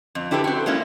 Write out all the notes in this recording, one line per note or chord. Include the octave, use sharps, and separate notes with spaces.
F2
D4 E4 G4 A4 B4
C4 F#4
F#3 G#3 A#3 C#4 E4